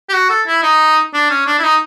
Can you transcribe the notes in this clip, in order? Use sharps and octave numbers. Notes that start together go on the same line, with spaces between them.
G4
F#4
A4
E4
D#4
D4
C#4
D4
E4
D#4